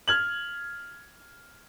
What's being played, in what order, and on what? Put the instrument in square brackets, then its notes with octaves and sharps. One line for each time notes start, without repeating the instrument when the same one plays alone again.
[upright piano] F6 G#6 F#7